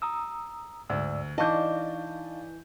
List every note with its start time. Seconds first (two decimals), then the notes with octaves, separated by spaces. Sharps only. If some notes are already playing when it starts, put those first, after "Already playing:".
0.02 A#5 D#6 E6
0.89 D2 G#2 D5 E6
1.38 E3 D4 D#4 D#5 F5 A5 C#6 G6